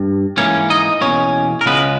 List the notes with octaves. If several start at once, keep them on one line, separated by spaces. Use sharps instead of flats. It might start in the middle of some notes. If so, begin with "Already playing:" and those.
Already playing: G2
G#2 E3 A#3 C#4 C#5
D#4 D#5
E2 B2 A#3 C#4 C#5
A#4
C#2 C#3 G#3 B3 B4